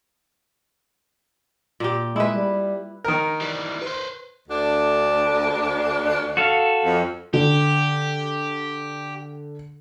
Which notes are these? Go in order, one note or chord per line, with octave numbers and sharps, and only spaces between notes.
A#2 G4
G#3 E4 B4
G3
D#3 A#4
E3 G3
B4 C5
D2 D4
F#4 A4 F5
F2
D3 G4